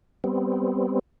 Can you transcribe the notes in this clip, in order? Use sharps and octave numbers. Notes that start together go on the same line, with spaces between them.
G3 B3 C4